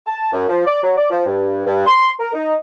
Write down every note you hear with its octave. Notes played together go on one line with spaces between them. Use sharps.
A5
F#2
F3
D5
F#3
D5
F3
G2
G2
C6
A#4
D#4